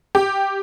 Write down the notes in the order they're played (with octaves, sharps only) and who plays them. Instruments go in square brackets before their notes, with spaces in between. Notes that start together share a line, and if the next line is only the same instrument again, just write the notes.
[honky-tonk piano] G4